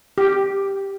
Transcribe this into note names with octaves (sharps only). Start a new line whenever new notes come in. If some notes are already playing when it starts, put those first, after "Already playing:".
G4